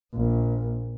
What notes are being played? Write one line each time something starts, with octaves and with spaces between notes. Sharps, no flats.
A#1